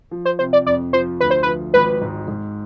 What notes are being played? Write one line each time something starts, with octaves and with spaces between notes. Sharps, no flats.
F3
C5
C3 C5
D5
F2 D5
F3 C5
D2 B4
C5
F3 B4
G#1 B4
G#2
G#2